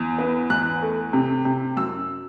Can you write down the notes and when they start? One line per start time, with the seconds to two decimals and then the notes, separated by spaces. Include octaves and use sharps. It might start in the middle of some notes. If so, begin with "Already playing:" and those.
Already playing: E2
0.19 B3
0.50 E2 F#6
0.82 A3
1.13 C3
1.45 C3
1.77 F#2 E6